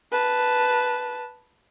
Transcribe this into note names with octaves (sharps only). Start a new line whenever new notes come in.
B4 A5